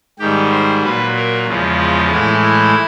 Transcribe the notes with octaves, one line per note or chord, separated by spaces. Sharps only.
G#2 D#3 G3 G4
C5
A#2 F#3 B4
A#4
E2 C#3 F3 G#3
F4
A2 E3 G#3 E4
E4